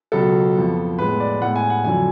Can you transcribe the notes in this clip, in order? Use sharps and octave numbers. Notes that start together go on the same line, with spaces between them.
C#2 B2 F#3 B3 A4
F2 F3 B3
A2 G#3 B3 B4
D5
A2 G#3 B3 F#5
G#5
F#5
F2 D3 F#3 G#5